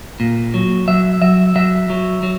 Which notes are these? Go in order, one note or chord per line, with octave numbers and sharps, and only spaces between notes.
A#2
F#3
F#3 E5
F#3 E5
F#3 E5
F#3
F#3